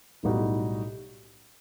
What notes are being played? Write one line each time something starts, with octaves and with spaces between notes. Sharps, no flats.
B1 A2 G3 D#4 F#4